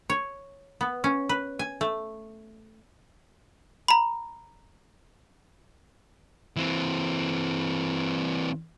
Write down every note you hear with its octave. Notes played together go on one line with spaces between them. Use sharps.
C#5
B3
C#4
B4
G#5
A3
A#5 B5
E3 C4